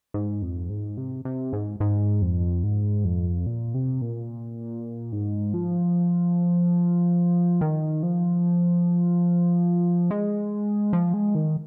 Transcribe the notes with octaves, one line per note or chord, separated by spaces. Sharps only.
G#2
F2
G#2
C3
C3
G#2
G#2
F2
G#2
F2
A#2
C3
A#2
G#2
F3
D#3
F3
G#3
F3
G#3
D#3